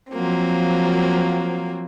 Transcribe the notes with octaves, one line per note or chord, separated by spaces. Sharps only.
F3 F#3 A#3 C4